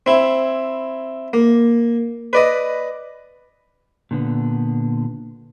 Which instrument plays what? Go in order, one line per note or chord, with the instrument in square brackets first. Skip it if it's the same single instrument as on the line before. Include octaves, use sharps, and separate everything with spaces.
[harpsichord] C4 E4
A#3
B4 D5 D#5
[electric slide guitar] A#2 D3 B3